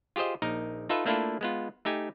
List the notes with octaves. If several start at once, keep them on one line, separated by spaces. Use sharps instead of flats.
F4 G4 G#4 C5 D#5
A#1 D#4 A#4
D#4 F4 A4 B4 E5
A3 A#3 D4 E4 F4 A4
G#3 B3 F4
A3 D#4 G4 G#5